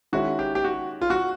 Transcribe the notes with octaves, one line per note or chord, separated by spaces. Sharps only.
D#3 G#3 C#4 E4 F#4
G4
G4
F#4
F4
F#4